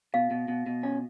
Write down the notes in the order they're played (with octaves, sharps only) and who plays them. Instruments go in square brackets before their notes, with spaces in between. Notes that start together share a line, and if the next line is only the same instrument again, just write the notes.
[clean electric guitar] B2 [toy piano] F5
[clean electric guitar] B2
B2
B2
C#4